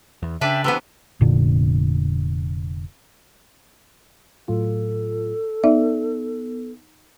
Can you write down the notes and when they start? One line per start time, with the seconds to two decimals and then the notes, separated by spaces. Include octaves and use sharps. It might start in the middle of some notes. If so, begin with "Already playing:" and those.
0.22 E2
0.41 C#3 D4 B4 D5 E5 G5
0.64 C3 E3 B3 B4 E6
1.21 F1 A#2 D3
4.48 A2 F#3 F4 A4
5.64 B3 D#4 D5 E5